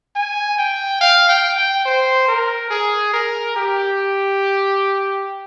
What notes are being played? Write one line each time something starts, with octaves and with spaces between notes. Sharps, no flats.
G#5
G5
F5
G5
G5
C5
A#4
G#4
A#4
G4